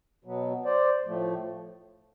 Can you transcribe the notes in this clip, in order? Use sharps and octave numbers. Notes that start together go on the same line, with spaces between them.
B2 F#3 B3
C5 D5
A2 F3 A3